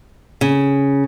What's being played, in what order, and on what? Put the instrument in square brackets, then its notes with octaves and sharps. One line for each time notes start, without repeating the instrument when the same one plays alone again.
[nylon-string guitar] C#3